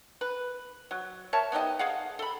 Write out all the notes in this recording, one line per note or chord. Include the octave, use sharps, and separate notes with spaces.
B4
F#3
A#4 C#5 E5 A5
B3 D#4 G4 D#5
G#4 F5 F#5
A4 B5